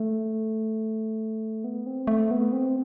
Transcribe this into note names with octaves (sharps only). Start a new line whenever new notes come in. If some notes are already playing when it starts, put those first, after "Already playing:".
Already playing: A3
B3
C4
A3
B3
C4